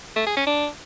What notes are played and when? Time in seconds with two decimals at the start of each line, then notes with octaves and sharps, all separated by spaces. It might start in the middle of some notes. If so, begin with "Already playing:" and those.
0.16 A3
0.26 G#4
0.36 C#4
0.47 D4